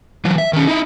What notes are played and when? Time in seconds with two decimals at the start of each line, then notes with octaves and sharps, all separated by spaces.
0.25 E3 F#3
0.38 E5
0.53 D#3 C#4
0.68 D#4 E4